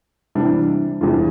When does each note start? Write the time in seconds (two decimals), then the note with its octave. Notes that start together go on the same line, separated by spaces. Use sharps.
0.35 C3 E3 G3 D4
1.01 E2 C3 G3 D4 F4